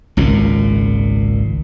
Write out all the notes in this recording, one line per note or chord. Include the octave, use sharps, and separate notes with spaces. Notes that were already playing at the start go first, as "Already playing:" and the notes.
G#1 C#2 A#2